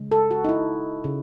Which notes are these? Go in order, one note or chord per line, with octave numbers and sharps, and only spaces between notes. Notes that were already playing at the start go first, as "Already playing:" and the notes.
Already playing: C#3 G#3
A4
F#4
D#4
E4
C#3